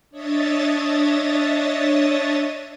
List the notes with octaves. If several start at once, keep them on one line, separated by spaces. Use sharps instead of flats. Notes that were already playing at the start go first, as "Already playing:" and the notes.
D4 C#5 D#5 E5 D#6 A6